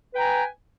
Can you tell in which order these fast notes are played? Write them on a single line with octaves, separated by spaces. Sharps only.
B4 G5 A#5 G#5